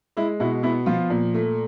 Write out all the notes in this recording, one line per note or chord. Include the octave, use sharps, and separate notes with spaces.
G#3 E4
B2 E4
B3 E4
F3 F4
A#2
A3